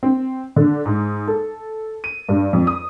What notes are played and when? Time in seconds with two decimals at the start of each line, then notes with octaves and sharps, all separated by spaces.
0.03 C4
0.56 D3
0.86 G#2
1.27 A4
2.04 D#7
2.29 G2
2.53 F2
2.67 D#6